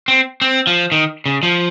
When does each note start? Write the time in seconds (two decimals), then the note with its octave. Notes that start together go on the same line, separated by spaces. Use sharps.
0.08 C4
0.41 C4
0.67 F3
0.92 D#3
1.26 C#3
1.43 F3